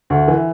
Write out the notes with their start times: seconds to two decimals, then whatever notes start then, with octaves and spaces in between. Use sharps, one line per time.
0.10 D2
0.28 E3